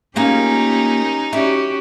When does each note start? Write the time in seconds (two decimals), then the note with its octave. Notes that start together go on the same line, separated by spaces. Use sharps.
0.16 A#3 C#4 D#4 F4 G4 G#4
1.33 C#4 E4 F#4 G4